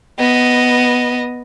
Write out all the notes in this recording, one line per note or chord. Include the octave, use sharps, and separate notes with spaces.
B3 D#5